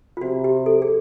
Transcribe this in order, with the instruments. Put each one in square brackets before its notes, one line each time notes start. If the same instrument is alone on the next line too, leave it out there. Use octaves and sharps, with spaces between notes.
[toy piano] F4
[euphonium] C3 [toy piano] F#4
[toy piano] G4
A4
G#4